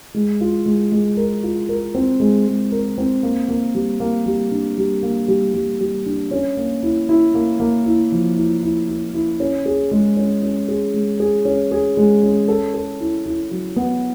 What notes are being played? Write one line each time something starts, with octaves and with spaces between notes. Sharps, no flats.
G#3
F4
G#3
G#3
A#4
F4
A#4
C4
G#3
G#3
A#4
C4
A#3
A#3
G3
A#3
G3
D4
G3
A#3
G3
G3
G3
D4
C#4
A#3
E4
E4
A#3
A#3
E4
F3
E4
E4
E4
E4
C#4
G#4
G#3
C#4
C#4
G#4
G#3
G#4
C#4
G#4
G#3
C#4
A4
A4
E4
E4
F#3
B3